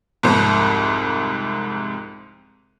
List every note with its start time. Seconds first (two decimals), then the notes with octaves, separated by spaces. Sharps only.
0.23 C2 F2 G#2